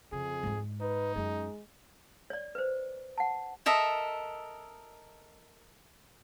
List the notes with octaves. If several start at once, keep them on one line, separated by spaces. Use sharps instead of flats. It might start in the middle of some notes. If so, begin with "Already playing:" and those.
F2 C#3 G#4
G#2 G#3
D#4 B4
F#2 G#3 C#4
C#5 D5
B4 C5
F#5 A5
A4 A#4 D#5 E5